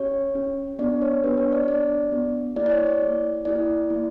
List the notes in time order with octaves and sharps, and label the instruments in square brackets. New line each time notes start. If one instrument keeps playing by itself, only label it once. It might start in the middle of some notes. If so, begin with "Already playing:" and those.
Already playing: [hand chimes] C#4 G4 C#5
C#4 G4
B3 D4 G4 D5
C#5
B3 D4 G4 B4
C#5
D5
B3 D4 G4 D5
B3 D4 G4
A#3 E4 G4 D5
D5
C#5
D5
A#3 E4 G4
A#3 E4 G4 D5
A#3 E4 G4